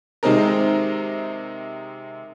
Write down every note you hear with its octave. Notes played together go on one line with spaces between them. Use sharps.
C3 D#3 G#3 C4 D#4 A#4